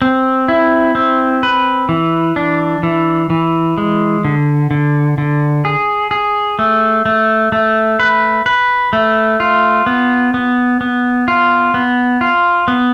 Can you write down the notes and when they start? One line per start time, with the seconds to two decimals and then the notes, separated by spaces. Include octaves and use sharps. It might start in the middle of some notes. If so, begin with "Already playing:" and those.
0.02 C4
0.48 E4
0.95 C4
1.43 B4
1.89 E3
2.36 D4
2.83 E3
3.30 E3
3.78 G#3
4.25 D3
4.71 D3
5.18 D3
5.65 G#4
6.11 G#4
6.59 A3
7.06 A3
7.52 A3
8.00 B4
8.46 B4
8.93 A3
9.40 F4
9.86 B3
10.34 B3
10.81 B3
11.28 F4
11.74 B3
12.21 F4
12.68 B3